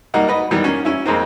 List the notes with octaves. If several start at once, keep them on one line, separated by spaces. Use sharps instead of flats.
G3 A#3 D#4 F#4
F#4 B4 D#5
D#3 E3 G3 B3
A#3 C#4
C#4 E4
F2 G#3 A#3 C4